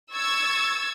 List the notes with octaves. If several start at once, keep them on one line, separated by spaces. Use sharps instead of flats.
C#6 E6 G#6 A6